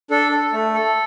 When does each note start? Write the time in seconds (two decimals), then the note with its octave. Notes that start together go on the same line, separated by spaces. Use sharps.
0.11 D4 A4
0.32 A4
0.53 A3
0.74 A4